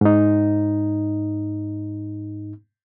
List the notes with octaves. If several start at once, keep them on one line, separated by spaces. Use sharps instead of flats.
G#2 D#4